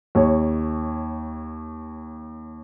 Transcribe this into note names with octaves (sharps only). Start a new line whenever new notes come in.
D#2 C#5